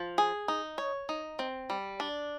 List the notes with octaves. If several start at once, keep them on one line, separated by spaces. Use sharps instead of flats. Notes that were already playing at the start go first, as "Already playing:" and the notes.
Already playing: F3
G#4
D#4
C#5
D#4
C4
G3
D4